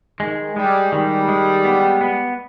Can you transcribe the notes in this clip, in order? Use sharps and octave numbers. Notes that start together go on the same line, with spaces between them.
D#3 G#3
G3 G#3
D#3 G3
G#3
B3
B3